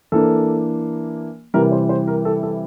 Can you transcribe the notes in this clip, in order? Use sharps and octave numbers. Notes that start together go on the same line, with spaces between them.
E3 A#3 D4 A4
C3 E3 G3 A#4
C5
C5
A#4
A4
A4